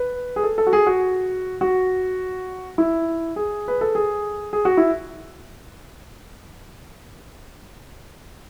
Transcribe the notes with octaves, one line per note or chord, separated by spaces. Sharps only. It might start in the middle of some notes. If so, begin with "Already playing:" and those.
Already playing: B4
G#4
A4
A4
F#4
G#4
F#4
F#4
E4
G#4
B4
A4
G#4
G#4
F#4
E4